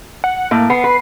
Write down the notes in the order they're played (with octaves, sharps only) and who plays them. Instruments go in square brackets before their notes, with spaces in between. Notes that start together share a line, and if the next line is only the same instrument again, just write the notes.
[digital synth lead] F#5
[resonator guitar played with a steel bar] A2 [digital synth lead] A#3
[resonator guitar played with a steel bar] B3 [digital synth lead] C7
[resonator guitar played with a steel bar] B4